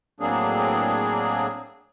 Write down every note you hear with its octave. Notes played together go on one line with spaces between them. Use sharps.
A2 F#3 A#3 C4 D4 G#4